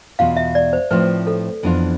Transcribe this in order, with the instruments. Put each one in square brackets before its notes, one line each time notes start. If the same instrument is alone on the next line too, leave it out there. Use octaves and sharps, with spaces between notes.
[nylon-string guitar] E2 B2 B3 F4 [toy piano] F5
[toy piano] E5
D5
C5
[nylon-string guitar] A2 F3 C4 F4 [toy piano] B4
[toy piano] A4
[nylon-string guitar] F2 E3 B3 D4 F4